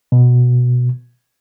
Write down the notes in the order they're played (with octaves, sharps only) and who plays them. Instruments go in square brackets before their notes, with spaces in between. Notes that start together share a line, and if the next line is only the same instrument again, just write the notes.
[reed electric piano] B2